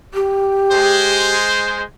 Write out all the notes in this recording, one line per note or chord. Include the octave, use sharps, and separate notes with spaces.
G4
G#3 C5